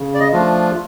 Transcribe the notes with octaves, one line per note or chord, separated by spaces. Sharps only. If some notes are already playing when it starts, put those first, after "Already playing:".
Already playing: C#3
D5
D#5
F3 A3 D4 F4